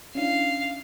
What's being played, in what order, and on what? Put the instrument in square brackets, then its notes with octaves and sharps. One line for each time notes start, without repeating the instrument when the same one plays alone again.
[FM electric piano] C#4 D4 E4 [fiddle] F5